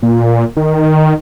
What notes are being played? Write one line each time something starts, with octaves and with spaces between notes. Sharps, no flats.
A#2
D#3